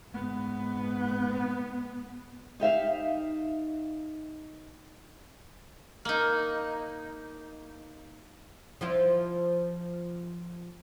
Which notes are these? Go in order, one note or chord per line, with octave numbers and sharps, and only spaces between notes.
G#2 B3
D#4 G4 E5 F5
A#3 D#4
F3 E4 F4